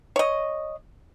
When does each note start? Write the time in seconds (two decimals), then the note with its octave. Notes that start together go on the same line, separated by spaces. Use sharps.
0.16 C#5 D#5